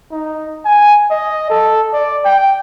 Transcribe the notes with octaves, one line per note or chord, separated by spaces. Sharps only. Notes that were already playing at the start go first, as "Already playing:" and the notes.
D#4
G#5
D#5
A4
D5
G5